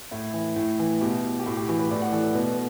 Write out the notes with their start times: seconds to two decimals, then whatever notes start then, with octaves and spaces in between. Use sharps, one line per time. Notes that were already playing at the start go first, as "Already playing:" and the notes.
0.11 A2 E4
0.34 E3
0.56 A2
0.79 E3
1.01 B2 G4
1.40 G4
1.46 A2 F#4
1.57 G4
1.68 E3 F#4
1.79 B4
1.90 A2 D5
2.02 F#5
2.12 E3 A4
2.24 A4
2.35 B2 B4